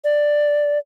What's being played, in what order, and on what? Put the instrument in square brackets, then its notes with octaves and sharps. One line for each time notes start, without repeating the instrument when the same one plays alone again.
[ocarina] D5